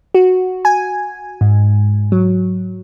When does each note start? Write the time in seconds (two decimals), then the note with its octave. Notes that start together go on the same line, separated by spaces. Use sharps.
0.14 F#4
0.65 G#5
1.41 G#2
2.12 F#3